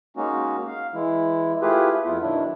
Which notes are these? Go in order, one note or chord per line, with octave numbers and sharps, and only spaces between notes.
G#3 A#3 C#4 D#4 F#4
F5
E3 G#3 E4
A3 E4 F4 G4 G#4 B4
F2 B3 E4 F4
B2 D#3 F#3 D4 E4